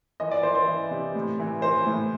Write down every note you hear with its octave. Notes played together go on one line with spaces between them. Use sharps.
E3 D#5
D5
E3 C5
C5
E3
C3
A2
E3
E3 C5
A2